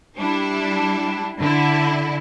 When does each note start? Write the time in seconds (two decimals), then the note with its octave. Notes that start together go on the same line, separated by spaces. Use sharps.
0.18 G3 D4 E4
1.39 D3 E4